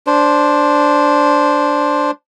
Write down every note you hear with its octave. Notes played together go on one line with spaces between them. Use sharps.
D4 C5